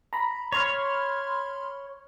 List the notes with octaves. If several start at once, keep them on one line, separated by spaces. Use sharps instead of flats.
A#5 B5
C#5 B5 C6 F6